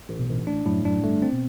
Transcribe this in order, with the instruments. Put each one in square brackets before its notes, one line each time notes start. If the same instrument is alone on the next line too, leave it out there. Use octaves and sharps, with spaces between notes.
[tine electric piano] A1
[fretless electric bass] B1 B2
[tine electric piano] A1
[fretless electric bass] A1 A2 [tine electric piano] D4
[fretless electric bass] F#2 [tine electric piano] A2
[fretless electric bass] F#2 [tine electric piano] D4
[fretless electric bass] G1 G2 [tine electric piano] A3
[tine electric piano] C4
[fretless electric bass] B2